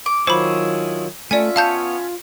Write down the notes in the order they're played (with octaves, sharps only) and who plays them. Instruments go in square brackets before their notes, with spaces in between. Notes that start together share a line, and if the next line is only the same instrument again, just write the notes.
[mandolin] D6
[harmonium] D#3 F#3 F4 [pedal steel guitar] E4 G#4 C#6 [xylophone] C5 B5
[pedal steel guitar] A3 [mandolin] C#4 E5 [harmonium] F4 [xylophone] D5 G#5
[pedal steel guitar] B3 C#5 [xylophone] F5 A5 G6